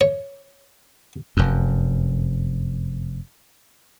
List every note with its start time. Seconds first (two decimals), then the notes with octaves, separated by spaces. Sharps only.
0.01 C#5
1.37 F1 F#2